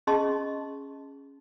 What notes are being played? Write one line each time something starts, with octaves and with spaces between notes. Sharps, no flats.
C#4 G#4 D#5 A5 C6 C#6